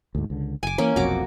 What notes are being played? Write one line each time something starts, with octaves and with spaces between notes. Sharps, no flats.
D2 G#2
C#2 D3
F#1 G#5 D6
E3 A#3 C#4
F1 B1 F2 F#4 A#5 D6